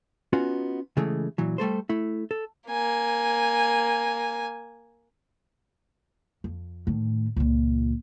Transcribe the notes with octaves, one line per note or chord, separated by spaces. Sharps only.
B3 C#4 D#4 F4 F#4
C#3 E3 G#3 A3
A#2 E3 F#3
G3 A3 A4 C5
A3 E4
A4
A#3 G#5
F2
A2 D#3
C#2 A#2